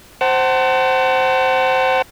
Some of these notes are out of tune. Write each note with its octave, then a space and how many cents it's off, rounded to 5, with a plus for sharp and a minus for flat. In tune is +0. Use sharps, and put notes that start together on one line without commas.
C5 +0 F#5 +35 A5 +25